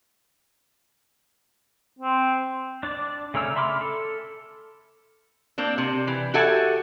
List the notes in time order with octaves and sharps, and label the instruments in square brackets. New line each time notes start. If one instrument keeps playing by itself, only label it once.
[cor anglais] C4
[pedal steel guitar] D4 D5
C#3 A3 C#4 A#4 E6
E5 B5 C6 D6 F6
A4
[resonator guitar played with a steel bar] A#3 C4 D4
C3
E3
F#4 G4 A4 E5 F#5 G#5